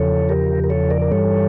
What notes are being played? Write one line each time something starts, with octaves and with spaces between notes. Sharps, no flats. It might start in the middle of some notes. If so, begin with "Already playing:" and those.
Already playing: E2 C#3 F3 A4 C#5
G4 A#4
A#4
A4 C#5
A#4 D5
A#4
G2 E3 G3 A4 C#5